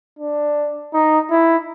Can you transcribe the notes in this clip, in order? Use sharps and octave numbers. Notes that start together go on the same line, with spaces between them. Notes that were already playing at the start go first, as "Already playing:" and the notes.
D4
D#4
E4